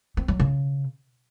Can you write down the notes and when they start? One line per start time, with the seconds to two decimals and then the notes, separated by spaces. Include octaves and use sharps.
0.17 C4
0.28 F#3
0.40 C#3